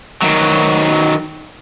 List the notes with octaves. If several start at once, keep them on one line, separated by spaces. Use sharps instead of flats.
D#3 F#3